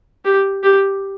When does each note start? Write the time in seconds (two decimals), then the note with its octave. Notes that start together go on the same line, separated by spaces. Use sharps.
0.25 G4
0.63 G4